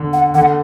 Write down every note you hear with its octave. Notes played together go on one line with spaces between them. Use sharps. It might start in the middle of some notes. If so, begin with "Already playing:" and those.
Already playing: D3
F#5
D3 F#5